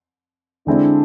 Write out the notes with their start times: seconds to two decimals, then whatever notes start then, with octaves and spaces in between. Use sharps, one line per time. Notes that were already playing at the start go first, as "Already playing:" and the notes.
0.66 D3 G#3 C4 D4 E4